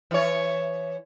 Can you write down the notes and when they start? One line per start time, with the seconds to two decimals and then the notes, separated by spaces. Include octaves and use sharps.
0.11 E3 C#5